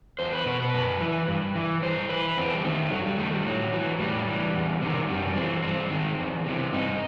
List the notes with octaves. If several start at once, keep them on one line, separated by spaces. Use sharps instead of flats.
E2 C5
B4
B2 B4
B4
F#2
E3
G2
E3
G2 C5
E3 B4
E2 C4
G3
D#3 A3
G2 F#3
G3
D#3 A3
G3
A2 F#3
E3
A2 G3
E3
E2
C3 D#3
F#2 G3
E3 C4
G2 C4
D#3
E2
C3 E3
G2 D#4